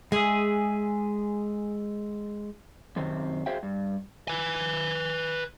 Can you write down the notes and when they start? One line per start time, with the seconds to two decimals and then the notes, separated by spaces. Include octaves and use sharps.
0.12 G#3 G#4 E5
2.96 F#2 C3 D#3 C4
3.46 F#4 G#4 C5 E5 F5 G5
3.63 G2
4.28 B4 G#5